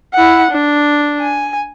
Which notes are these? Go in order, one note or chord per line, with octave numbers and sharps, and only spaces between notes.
E4 F#5
D4
G#5